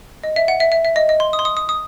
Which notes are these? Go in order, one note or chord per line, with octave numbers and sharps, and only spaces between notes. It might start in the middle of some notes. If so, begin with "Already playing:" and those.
D#5
E5
F#5
E5
E5
E5
D#5
D#5
C6
D#6
C6
D#6
D#6
D#6